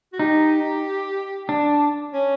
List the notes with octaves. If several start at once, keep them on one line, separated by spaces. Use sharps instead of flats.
F#4
D#4 G4
D4
C#4